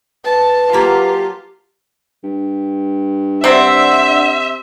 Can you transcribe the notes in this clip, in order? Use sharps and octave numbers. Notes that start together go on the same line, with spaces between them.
B4 A5
F#3 A#3 F4 G4
G2
C3 C4 D4 D5 E5 F#5